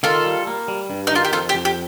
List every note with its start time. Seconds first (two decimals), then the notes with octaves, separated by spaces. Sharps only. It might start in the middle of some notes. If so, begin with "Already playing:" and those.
0.03 D#3 F4 A4
0.25 G3
0.47 A#3
0.68 G3
0.90 G2
1.07 D#4
1.11 D#3 F4
1.25 G4
1.32 F2 F4 A4
1.49 G4
1.54 F2
1.65 G4